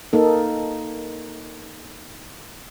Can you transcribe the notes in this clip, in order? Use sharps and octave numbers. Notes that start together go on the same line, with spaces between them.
A#3 D#4 A4